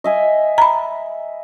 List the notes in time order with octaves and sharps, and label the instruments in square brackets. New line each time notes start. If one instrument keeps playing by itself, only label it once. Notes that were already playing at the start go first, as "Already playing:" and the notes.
[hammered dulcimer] D#5 E5 G#5
[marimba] A#5 B5